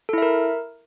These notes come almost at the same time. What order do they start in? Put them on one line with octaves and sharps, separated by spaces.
A4 E4 E5 A#4